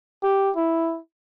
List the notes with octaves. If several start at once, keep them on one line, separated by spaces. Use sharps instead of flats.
G4
E4